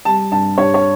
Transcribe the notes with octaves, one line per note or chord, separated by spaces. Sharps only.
G3 A5
G2 A5
G2 C#5
C#5